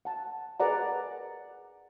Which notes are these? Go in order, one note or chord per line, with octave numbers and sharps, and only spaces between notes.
F#5 A5
G#4 A#4 B4 D5 F#5 A#5